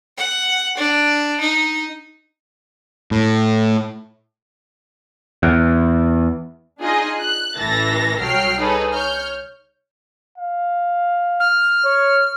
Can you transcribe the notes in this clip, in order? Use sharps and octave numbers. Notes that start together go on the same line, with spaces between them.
F#5
D4
D#4
A2
E2
D4 D#4 F4 G#4 D#5
F#6
A1 E3 A4 E5 A6 A#6
C2 F#3 G5 F6 C7
D#4 G#4 A4 B4 C#5
C#5 F6 G6
F5
F6
C#5